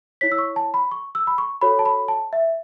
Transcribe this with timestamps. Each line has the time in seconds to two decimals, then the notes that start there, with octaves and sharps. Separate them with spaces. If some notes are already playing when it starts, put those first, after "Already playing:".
0.21 E4 C#5 B6
0.32 E6
0.38 C#6
0.56 A5
0.74 B5
0.91 C#6
1.15 E6
1.27 B5
1.38 C#6
1.61 F#4 A4 C#5 B5
1.79 A5
1.85 B5
2.08 A5
2.33 E5